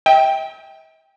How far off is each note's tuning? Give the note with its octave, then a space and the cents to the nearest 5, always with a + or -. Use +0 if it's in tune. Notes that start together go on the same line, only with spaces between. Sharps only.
E5 -45 G5 +0